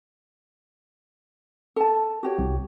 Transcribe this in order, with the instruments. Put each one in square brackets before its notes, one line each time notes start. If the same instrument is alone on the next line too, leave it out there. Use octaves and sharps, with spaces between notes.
[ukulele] A4 A5
F#4 G4 C#5
[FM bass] C2